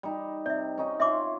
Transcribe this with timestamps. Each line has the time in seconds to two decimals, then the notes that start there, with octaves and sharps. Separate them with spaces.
0.03 G3 D#4
0.46 C3 D5 E5
0.78 C#4 D#4 D#5
1.00 C#4 E4 F4 E5 C6 D6